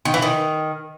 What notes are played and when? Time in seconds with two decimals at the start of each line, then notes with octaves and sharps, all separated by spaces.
0.05 D#3
0.14 E3
0.22 D#3